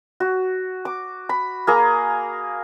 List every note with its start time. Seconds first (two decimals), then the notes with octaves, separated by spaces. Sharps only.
0.20 F#4
0.85 D6
1.29 B5
1.67 A#3 G#4 A#5